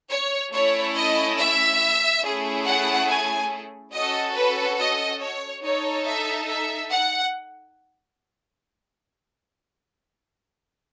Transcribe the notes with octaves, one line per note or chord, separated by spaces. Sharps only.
C#5
A3 C#4 E4 C#5
D#5
E5
A3 C#4 E4 G#4
F#5
G#5
C#4 F#4 A4 D#5
B4
D#5
C#5
D#4 A4 C#5
E5
E5
F#5